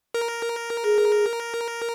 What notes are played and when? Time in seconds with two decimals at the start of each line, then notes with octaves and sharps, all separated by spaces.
0.14 A#4
0.84 G#4